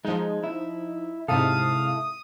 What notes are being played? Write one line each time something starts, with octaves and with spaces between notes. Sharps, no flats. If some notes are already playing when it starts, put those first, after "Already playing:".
F3 G#3 D#4
E4
G#2 C3 E4 A4 F5 D#6